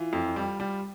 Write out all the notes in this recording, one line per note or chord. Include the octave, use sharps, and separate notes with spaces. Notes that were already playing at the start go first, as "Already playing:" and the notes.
Already playing: E3 F4
F2
G3
G3